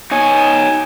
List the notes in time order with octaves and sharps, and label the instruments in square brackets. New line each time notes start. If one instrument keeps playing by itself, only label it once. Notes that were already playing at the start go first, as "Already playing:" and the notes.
[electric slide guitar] D#4 C#5 [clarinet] G#5